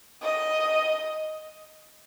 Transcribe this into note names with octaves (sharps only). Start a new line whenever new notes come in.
D#5